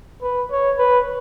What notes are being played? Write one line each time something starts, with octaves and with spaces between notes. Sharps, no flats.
B4
C#5
B4